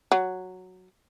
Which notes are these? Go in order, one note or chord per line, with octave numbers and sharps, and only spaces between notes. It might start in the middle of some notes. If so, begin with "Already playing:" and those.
F#3